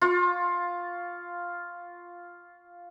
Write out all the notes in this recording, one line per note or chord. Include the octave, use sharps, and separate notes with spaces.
F4 C#6